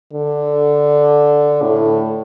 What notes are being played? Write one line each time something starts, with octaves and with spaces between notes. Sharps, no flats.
D3
A2